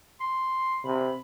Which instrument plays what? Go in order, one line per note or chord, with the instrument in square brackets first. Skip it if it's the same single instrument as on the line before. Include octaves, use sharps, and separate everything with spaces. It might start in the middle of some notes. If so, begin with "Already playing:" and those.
[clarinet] C6
[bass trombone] C3 [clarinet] B5